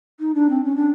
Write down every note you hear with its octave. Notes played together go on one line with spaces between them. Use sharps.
D#4
D4
C4
C#4
D4